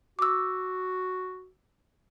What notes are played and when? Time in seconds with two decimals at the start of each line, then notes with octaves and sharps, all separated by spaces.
0.19 F#4 D6 E6